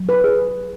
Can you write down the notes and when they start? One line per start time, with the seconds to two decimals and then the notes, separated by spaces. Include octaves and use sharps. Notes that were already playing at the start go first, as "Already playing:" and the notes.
Already playing: F#3
0.09 B4
0.24 G#4